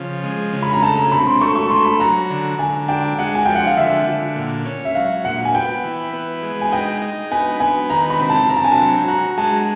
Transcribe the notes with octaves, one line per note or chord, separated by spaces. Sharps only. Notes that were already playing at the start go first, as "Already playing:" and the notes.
Already playing: C#3 F3
G#3
C#3
B5
A#5
A3 A5
A#5
C3 B5
C6
A3 C#6
C#6
A3 C6
B5
F#3 A#5
D3
D3 G#5
D4 G5
G#3 F#5
G#5
F3 G5
F#5
F5
D3 E5
D3
A#2
C#4
E5
F#3 F5
A#2 F#5
G#5
B3 G5
E3
B3
G#3
G#5
D#4 G5
D#4
B3 G#5
B3 G#5
D#3 A#5
B5
C3
A5
C3 A#5
A5
G#5
A5
F#3
F#4 A#5
G#3 A5